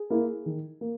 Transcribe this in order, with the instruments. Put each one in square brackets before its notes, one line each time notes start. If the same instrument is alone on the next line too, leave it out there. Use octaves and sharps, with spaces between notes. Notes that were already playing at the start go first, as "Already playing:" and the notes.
Already playing: [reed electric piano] G#4
[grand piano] A#3 E4
D#3
A#3